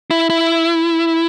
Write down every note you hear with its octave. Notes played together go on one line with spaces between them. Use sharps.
E4
E4